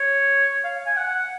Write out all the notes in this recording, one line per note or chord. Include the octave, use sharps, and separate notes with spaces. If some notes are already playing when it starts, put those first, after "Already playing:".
Already playing: C#5
F5
G#5
F#5
F#5